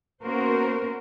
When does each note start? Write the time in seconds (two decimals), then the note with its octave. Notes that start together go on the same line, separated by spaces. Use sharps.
0.24 A#3 B3 C#4 F#4 A#4 C5